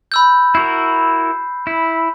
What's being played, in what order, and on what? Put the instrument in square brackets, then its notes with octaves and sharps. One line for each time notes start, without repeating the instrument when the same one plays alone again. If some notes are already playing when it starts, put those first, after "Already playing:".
[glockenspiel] B5 E6 G6
[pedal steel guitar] E4 F#4 A#4 [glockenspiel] C7
[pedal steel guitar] E4